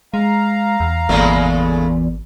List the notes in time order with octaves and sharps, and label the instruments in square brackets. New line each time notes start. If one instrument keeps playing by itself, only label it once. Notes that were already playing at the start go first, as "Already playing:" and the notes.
[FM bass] G#3 [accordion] F5 A#5
[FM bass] E2
[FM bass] G#1 [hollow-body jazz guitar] E2 A#2 [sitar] C#3 G#3 A3